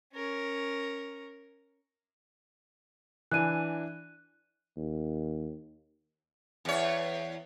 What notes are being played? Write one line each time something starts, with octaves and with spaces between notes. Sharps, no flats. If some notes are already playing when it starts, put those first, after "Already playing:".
C#4 A#4
E3 D4 G#5 F#6 D#7
D#2
E2 C#5